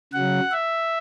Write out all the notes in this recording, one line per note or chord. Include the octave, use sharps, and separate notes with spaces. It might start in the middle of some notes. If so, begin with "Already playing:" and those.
C#3 F#3 F#5
E5